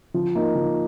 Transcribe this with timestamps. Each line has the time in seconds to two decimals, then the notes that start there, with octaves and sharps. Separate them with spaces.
0.14 F3
0.35 A#3 D#4
0.55 F3